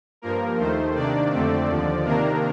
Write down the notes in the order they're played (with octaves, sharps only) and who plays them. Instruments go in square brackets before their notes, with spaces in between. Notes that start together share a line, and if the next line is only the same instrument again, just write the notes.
[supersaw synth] G2 F3 A#3 A#4
D#2 D#3 A3 C5
C3 D#3 A#3 D4 D5
F2 D3 A3 C4
D#2 D3 F3
C3 D#3 A#3 D4 A#4